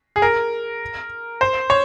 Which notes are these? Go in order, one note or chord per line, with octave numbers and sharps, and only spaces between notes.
G#4
A#4
C5
C#5